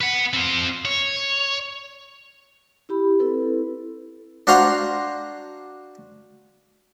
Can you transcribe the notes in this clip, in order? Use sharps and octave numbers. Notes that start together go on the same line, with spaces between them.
B4 F#5
C4 F4
C#5
E4 G4 B5
C4 E4 A4 B4
D4 F#4 C5 F5 A#5 C6